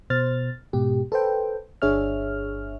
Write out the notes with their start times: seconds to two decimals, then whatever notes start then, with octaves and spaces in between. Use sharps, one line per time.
0.10 B2 C5 F6 A6
0.73 G#2 B2 G4
1.12 A4 B4 C5 G5
1.82 G1 D4 G#4 C#5 E5 F6